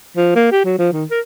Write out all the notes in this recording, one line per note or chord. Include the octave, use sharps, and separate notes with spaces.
F3
A#3
G4
F#3
F3
D#3
A#4